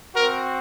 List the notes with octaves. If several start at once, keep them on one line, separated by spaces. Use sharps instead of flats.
C4 F#4 A#4